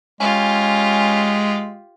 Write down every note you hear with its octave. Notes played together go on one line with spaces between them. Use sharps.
G#3 C#4 F4 G4